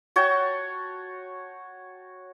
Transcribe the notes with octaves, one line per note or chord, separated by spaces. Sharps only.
F#4 C#5 G5 A5